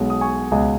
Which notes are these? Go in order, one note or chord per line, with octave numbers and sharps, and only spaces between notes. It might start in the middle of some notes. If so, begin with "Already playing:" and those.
Already playing: B1 B2 G#3
D#6
G#5 C#6
C#2 B2 G#3 D#5 G#5